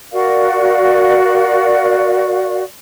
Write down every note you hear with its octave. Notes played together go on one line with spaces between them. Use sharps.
F#4 A#4 D5 F5